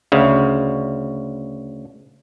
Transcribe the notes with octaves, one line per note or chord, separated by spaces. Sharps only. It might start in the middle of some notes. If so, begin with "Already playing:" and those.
D2 C#3